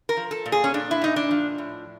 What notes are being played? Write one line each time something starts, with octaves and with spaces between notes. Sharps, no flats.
A#4
F3
A4
A#2
G#4
C#4
A#2 D4
E4
A#2 D#4
D4
F3
A2